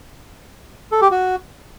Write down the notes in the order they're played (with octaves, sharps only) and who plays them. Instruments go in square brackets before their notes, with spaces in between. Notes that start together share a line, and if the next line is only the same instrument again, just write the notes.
[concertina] A4
G4
F#4